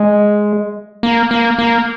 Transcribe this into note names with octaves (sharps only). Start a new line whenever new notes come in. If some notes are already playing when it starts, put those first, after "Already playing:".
Already playing: G#3
A#3
A#3
A#3